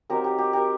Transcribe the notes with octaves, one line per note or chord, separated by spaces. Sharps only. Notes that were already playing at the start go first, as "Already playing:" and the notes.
F#3 C4 D#4 G4 A#4
G4
G4
G4 A#4